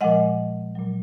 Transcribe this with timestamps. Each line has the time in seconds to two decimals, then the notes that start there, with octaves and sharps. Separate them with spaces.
0.01 A#2 F3 G#3 D#5 F#5
0.75 A#2 F#3